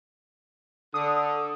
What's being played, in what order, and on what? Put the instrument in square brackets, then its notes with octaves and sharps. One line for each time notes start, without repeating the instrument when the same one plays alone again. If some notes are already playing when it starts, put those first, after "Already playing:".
[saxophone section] D3 [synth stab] D#6